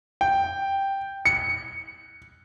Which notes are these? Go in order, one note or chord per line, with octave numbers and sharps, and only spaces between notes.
G5
C#7